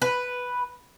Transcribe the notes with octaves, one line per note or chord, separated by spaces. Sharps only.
B4